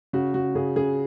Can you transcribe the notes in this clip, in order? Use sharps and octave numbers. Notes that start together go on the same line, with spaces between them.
C#3 F#4
C#3 F#4
C#3 G#4
C#3 G#4